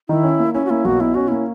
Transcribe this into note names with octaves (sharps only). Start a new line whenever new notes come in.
D#3 E4
C#4
A#3
C#4 E4
F#4
A#3 E4
B1 F#4
B2 E4
C#4 F#4
A#3 E4